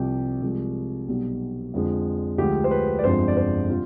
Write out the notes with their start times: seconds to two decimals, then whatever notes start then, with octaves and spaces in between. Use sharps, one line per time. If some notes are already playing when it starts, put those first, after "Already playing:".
Already playing: C2 C3 F3 G4
0.42 C2 C3 F3 G#3
1.08 B1 B2 G3
1.74 F2 D3 F3 G#3
2.38 D2 D3 F3 G#3 G4
2.64 C5
2.71 B4
2.99 D5
3.04 G1 F2 C3 F3 G#3 C5
3.28 D5
3.37 C5
3.69 C3 G3 F4